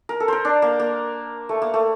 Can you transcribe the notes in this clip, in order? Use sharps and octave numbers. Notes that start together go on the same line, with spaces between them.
A#4
A4
A#4 C5
D4
A#3
A#3
A3
A#3
A3